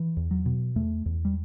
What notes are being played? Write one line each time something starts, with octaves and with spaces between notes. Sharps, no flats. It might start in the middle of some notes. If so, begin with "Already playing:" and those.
Already playing: E3
E2
F#3
B2
E2 A3
E2
G3